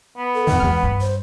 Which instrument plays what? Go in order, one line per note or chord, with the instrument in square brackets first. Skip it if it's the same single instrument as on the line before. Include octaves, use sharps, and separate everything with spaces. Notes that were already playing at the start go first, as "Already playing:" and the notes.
[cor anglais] B3
[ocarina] A4
[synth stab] F2 D#3 [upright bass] A2 [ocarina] F#5
[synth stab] E2 F6 [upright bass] G#3 C4
[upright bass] G2
[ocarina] C5